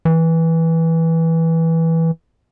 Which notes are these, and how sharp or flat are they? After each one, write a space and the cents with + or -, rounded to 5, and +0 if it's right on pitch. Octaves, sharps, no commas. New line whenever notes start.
E3 -10